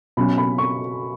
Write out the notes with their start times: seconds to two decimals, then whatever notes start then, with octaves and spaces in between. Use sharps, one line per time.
0.17 B2 F#3 C#4 B5
0.38 B5
0.58 C#6